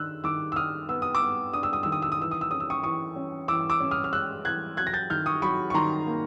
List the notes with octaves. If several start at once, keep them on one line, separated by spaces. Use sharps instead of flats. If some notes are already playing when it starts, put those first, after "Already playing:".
Already playing: D#3 D4 E6 F#6
D#3 D6 E6
E6
D#3 D#6 F6
B3 E6
D#6
D6 E6
B3
D4 D#6
E6
D#6
D#3 E6
D#6
E6
D#6
E3 E6
D#6
E6
C#4 D#6
E6
C#6 D#6
E3 C#6 D#6
C#4
E3 D6 E6
D6 E6
C#4
D#6 F6
F6
G#3 E6 F#6
E3 F#6 G#6
F#3 F#6 G#6
A#6
G6 A6
D#3 F6 G6
C#6 D#6
F#3 B5 C#6
C#6
D#3 A#5 C6
A#3